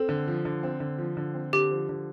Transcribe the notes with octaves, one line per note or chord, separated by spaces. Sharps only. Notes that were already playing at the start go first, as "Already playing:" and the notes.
Already playing: C4 A4
D3
F3
D3
C4
D3
F3
D3
C4
D3 G4
F3
D3